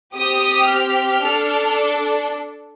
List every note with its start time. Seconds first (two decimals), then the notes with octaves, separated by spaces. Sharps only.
0.14 C4 G4 D#6
0.68 F6
1.22 D4 A4